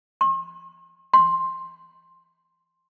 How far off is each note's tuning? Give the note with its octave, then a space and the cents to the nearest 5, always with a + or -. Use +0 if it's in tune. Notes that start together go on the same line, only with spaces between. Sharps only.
C6 +45
C6 +10